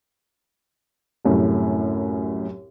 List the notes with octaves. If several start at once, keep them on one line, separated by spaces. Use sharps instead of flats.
C2 F#2 A2